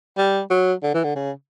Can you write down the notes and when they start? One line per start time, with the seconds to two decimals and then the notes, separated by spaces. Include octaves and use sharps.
0.17 G3
0.50 F#3
0.83 D3
0.94 E3
1.04 D3
1.16 C#3